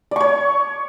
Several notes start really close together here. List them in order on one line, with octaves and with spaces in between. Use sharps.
D5 C#6 C#5